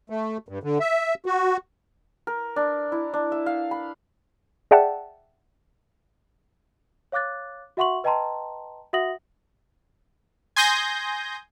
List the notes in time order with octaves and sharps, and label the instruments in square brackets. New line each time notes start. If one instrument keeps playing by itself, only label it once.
[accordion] A3
G2
D3
E5
F#4
[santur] A#4
D4
E4
D4
E5
F5
B5
[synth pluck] G#4 D5 E5 F#5 G5 A5
[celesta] C#5 F5 D6 F#6 A6
F#4 E5 F#5 C6 C#6 F#7
B4 D#5 G5 A5 A#5 C6
F#4 E5 F#5 D#6 A#6 F#7
[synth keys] G#5 C6 D#6 G6 A#6